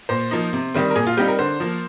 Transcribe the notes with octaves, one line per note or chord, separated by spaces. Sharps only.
A#2 C5
F3 A#3 D#4
C3
D#3 G3 C4
A#4
A#2 G#4
F4
G3 C4 D#4 G4
A#4
D3 C5
F3 A#3